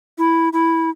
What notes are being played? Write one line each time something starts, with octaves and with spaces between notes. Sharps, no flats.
E4
E4